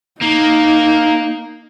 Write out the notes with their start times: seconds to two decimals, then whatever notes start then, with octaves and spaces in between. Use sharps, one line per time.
0.21 A#3 D#4